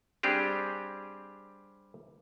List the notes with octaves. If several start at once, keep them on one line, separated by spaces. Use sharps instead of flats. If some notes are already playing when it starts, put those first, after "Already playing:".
G3 C4 D4 G4 G#4